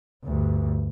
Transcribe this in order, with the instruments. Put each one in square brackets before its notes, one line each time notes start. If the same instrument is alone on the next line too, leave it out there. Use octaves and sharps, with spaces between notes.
[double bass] D2 G2